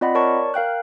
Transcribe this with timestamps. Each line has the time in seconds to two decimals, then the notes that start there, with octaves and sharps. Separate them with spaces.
0.01 C4 F4 D5 D#5 F#5 B5
0.15 A#4 C#5 D5 A5 C#6
0.54 A#4 F5 G5 F#6